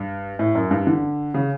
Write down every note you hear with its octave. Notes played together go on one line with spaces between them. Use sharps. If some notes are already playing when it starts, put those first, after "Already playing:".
Already playing: G2
A2
F#2
G2
D3
C#3